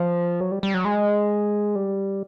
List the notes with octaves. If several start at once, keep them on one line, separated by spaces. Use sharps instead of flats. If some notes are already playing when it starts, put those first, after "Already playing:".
Already playing: F3
F#3
G3
G3
F#3
G#3
G3